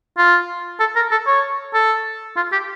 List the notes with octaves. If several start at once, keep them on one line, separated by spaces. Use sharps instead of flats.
F4
A4
A#4
A4
C#5
A4
F4
G4